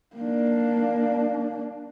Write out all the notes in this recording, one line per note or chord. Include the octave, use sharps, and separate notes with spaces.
A#3 D4